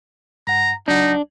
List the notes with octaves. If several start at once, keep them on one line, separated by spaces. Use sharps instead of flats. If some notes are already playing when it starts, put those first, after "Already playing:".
G2 F#5 A#5
C#2 F#3 D4 D#4 F#5